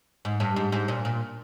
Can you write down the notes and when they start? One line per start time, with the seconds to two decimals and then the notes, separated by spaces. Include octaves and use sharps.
0.25 G#2
0.40 G2
0.56 G#2
0.72 G#2
0.88 A#2
1.05 A#2